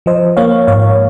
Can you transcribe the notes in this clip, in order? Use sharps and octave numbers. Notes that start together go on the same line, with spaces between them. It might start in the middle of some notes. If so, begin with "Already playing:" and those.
F3 C5 D#5
A#3 C#5 F5
G#2 C#5 F5